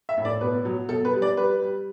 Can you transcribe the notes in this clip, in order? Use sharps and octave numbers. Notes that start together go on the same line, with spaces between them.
E5
A2
D5
B2 B4
F#3
B2 A4
B4
G3
D5
G3 B4
G3